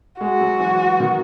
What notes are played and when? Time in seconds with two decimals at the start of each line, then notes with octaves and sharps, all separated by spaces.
0.21 G#3 F#4
0.41 F#3
0.60 E3
1.00 D#3